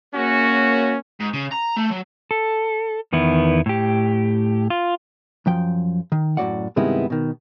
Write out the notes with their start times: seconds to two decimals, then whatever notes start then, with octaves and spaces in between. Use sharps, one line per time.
0.14 F#2 C#3 A#3 C#4 F#4 C#5
1.20 G#2
1.33 C#3
1.51 A#5
1.76 A3
1.91 F#3
2.31 A4
3.12 E2 D#3 B3 E4
3.66 A2 G4
4.70 F4
5.46 F#2 F3 G5
6.12 D#3
6.37 F#2 A2 B3 F#4 D5 F#5
6.76 G2 C3 D#3 G#3 B3 E4
7.10 B2 D#3